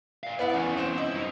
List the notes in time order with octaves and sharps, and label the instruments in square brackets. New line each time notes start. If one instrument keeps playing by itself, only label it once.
[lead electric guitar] D5 F5
[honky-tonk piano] B3 E4 F#5 [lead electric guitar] D5
[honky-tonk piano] E2 [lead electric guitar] B3 C#4
[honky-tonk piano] C4 C5
[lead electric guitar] E4 [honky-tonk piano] D#5
[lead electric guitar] F#2 D#4